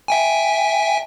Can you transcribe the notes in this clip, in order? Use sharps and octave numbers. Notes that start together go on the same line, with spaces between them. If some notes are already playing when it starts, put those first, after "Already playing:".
E5 G5 G#5